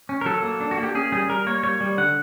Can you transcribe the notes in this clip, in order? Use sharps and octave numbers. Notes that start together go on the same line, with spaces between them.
C#4
A#4
F#3 A4
A#3
D4
F#4
A#3
G4
C#4 G#4
G3 G#4
G3 A#4
A#3 C#5
G3 C#5
G3
D3 F#5